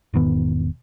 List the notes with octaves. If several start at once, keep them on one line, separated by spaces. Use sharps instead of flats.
E1 G#2 D#3 B3